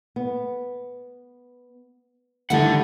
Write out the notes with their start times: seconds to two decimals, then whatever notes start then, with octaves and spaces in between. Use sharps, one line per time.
0.16 B3
2.50 D3 D#3 G3 A3 E4 F#5 A5